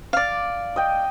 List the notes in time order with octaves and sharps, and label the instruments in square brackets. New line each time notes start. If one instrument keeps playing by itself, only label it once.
[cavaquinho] D5 F5
[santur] D#5 G5